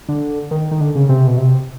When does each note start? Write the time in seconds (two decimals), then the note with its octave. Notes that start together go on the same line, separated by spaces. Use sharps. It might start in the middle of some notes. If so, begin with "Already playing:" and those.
0.09 D3
0.51 D#3
0.71 D#3
0.81 D3
0.95 C#3
1.09 C3
1.27 B2
1.38 C3